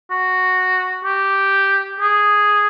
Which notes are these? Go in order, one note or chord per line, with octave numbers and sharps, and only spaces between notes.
F#4
G4
G#4